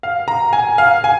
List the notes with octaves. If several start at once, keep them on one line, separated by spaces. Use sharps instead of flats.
F5
A#5
G#5
F5
G#5